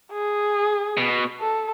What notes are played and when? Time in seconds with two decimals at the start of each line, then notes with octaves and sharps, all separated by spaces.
0.12 G#4
0.97 B2
1.40 A4